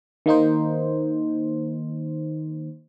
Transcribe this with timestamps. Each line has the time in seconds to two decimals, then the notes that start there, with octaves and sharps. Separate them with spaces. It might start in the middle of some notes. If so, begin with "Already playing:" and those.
0.26 D#3 A#3 D#4 C5